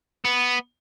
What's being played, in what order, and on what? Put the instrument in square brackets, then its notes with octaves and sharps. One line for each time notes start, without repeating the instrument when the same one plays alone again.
[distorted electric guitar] B3